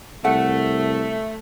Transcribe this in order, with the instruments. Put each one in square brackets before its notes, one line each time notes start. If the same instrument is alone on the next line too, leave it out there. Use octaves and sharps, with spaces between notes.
[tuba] C2 [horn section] A3 [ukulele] F#5